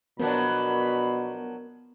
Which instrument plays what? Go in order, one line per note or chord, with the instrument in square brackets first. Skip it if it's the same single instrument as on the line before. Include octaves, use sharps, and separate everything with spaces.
[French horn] B2 [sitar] F3 F#3 D4 [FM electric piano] B3 A#4 [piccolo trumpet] B5